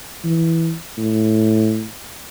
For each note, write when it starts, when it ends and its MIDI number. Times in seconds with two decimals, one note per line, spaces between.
0.24 0.75 52
0.98 1.87 45